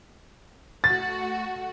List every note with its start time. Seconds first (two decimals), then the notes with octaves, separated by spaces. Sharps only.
0.84 A3 F#4 A6